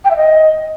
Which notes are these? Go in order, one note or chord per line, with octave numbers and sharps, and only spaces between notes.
G5
E5
D#5